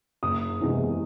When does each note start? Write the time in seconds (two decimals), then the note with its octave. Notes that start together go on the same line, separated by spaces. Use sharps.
0.23 F#1 D#6
0.61 E2 C3 E3 G#3